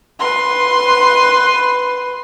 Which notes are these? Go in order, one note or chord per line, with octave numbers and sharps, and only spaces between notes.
B4 C6